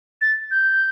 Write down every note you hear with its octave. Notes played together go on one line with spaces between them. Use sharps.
A6
G6